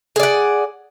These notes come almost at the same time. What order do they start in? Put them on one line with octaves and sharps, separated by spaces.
G#4 D5 F#5